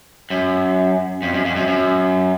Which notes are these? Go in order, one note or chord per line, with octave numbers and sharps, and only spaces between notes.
F#2
F2
F#2
F2
F#2
F#2